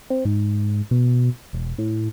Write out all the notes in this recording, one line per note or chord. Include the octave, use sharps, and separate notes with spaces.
C4
G#2
B2
E1
A2